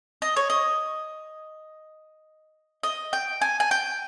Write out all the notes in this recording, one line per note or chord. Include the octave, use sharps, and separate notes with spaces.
D#5
C#5
D#5
D#5
G5
G#5
G#5
G5